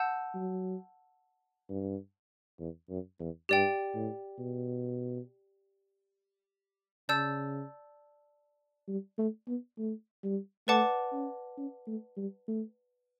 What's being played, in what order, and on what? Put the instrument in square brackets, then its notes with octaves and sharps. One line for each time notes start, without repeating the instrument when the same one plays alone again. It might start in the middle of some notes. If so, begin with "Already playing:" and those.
Already playing: [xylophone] F#5 A5 E6 G6
[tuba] F#3
G2
E2
F#2
E2
[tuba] G2 [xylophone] G4 D5 G5
[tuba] A2
B2
[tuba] C#3 [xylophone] D5 A5 E6 G6
[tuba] G3
A3
B3
A3
G3
[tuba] A3 [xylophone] B4 D5 F#5 A5 D6
[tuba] C#4
C#4
A3
G3
A3